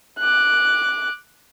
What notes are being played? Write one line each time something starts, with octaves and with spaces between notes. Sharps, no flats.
D6 F#6